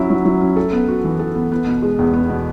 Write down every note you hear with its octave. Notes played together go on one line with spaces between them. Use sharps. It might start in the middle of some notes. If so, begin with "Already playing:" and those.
Already playing: F#3 C#4 E4
F#3
F#3
C#4
A4
B3
F#4
E3
A4
B3
B3
B2
G#3
E2
B3
B2